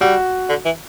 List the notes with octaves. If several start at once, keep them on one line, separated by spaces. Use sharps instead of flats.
G3 F#4
D3
E3